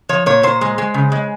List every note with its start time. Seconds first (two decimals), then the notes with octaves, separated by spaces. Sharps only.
0.09 F3 C#5
0.26 A#2 C#5
0.43 A#2 C5
0.61 G#3
0.78 G#3
0.94 C#3
1.12 G#3